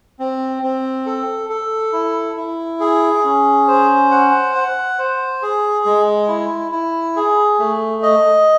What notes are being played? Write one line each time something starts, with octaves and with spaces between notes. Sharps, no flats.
C4
C4
A4
A4
E4
E4
G#4
C#4
C5
F#5
F#5
C5
G#4
G#3
E4
E4
G#4
A3
D#5